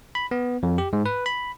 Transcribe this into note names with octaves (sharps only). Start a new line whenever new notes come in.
B5
B3
F2
G4
G#2
B4
B5